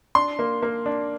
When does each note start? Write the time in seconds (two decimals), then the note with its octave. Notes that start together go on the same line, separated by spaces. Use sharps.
0.15 D4 C6
0.39 A#3
0.62 A#3
0.86 D4